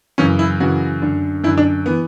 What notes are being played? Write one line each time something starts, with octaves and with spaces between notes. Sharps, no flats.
F#2 C#3 E3 C#4
E4
F#2 C#3 E3 F#4
F#2 D3
F#2 D3 E4
D4
E3 B3